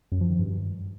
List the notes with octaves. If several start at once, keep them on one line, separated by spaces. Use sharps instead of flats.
F#2
F3
D#3
G2